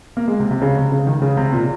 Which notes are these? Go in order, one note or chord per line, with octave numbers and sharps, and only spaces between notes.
A#3
G#3
C3
C3
C#3
C3
C#3
D#3
C#3
C3
A#2